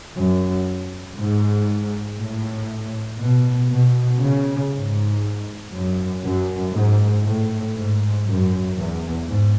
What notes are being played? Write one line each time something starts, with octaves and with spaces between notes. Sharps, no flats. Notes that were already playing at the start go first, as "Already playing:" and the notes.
F#2
G#2
A2
B2
B2
C#3
G#2
F#2
F#2
G#2
A2
G#2
F#2
E2
G#2